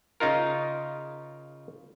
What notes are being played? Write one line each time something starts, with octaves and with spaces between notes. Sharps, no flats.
C#3 D#4 F4 A#4